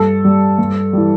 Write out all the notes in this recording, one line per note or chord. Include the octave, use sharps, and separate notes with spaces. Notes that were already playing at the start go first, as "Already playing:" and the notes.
Already playing: G2 A4
G3
G2
E3 G3